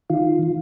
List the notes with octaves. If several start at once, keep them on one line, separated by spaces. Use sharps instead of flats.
D#3 F4
D#3